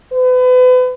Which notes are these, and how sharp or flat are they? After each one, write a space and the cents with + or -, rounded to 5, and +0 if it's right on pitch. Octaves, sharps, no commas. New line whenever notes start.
B4 +35